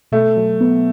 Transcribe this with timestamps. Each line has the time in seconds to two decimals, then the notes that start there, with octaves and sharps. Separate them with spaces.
0.12 B2 A3
0.37 F#3
0.61 B3